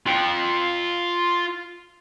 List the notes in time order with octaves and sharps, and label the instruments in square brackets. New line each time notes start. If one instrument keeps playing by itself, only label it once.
[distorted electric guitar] F4 G5